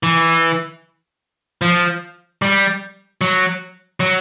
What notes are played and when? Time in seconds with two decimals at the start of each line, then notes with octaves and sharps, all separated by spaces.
0.03 E3
1.62 F3
2.42 G3
3.21 F#3
4.00 F#3